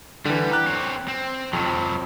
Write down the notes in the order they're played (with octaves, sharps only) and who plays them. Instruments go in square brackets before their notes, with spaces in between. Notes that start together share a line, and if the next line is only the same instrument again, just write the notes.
[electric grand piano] D3 E3 [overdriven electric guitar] G3
[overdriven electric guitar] G4 [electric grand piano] A#5 F#6
[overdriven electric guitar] C4 C#5
C4
[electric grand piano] F2 [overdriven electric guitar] C3 F#3